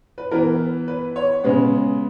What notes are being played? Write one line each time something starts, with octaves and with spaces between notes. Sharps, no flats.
B4
E3 B3 A#4
B4
C#5
C#3 G#3 B3